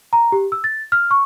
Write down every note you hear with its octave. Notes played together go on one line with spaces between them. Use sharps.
A#5
G4
E6
A6
F6
C#6